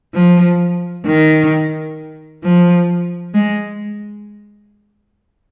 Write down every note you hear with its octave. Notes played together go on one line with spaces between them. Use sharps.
F3
D#3
F3
G#3